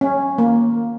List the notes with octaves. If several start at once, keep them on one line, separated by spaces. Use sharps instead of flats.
C#4
A#3